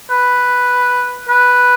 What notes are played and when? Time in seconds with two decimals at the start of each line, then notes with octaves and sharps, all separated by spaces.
0.11 B4
1.29 B4